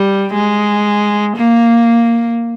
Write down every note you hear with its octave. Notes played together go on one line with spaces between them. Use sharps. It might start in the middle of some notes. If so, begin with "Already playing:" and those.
Already playing: G3
G#3
A#3